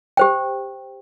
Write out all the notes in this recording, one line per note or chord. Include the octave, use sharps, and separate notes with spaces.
G4 C5 G5